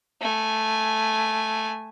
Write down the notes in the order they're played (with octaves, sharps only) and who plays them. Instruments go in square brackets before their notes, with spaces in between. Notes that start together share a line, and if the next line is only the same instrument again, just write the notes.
[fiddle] A3 G#5